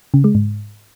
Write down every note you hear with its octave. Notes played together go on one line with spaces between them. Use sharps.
C#3
G#3
G#2